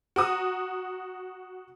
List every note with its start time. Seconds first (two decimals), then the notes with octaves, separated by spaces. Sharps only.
0.16 F#4 A#5 D#6